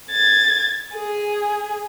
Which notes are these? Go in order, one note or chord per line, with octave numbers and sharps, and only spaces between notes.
G#6 A6
G#4